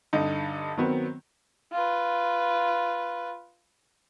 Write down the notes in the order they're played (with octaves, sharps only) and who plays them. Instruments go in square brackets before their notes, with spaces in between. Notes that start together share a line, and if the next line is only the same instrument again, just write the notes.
[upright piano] G2 D3 D#4
D#3 F#3 B3 C4
[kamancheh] F4 B4